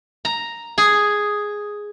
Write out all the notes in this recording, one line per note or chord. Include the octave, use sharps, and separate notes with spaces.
A#5
G#4